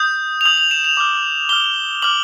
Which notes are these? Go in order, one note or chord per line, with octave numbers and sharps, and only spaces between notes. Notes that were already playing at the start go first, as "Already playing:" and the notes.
Already playing: D#6 G6
F7
D#6 G6 F#7
F7
E7
F7
D6 F6
D6 F6 G7
D6 F6 F#7